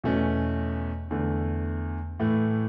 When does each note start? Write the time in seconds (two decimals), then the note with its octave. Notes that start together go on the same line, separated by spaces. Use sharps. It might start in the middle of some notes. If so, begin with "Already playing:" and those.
0.04 E2 B2 A3 C#4 F#4
1.11 E2 D3 A3
2.19 A2 E3 A3